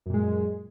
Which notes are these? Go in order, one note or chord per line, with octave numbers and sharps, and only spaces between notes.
F#2 A#2 G#3